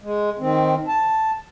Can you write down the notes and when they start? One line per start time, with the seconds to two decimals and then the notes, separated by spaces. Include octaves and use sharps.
0.01 G#3
0.39 D#3 C4
0.88 A5